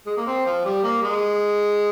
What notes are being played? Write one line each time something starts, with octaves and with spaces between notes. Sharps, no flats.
G#3
A#3
C4
F3
G3
A#3
G#3